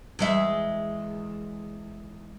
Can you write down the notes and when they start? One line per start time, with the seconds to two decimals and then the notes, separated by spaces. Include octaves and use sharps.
0.19 E2 G#3 E5